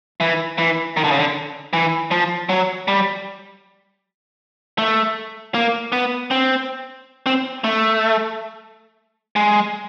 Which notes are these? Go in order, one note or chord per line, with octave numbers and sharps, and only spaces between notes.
E3
E3
D#3
D3
C#3
D3
E3
F3
F#3
G3
A3
A#3
B3
C4
C4
A3
G#3